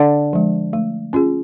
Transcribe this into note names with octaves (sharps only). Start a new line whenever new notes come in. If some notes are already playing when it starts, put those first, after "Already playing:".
Already playing: D3
F3 G#3
A3
C#4 F4 G#4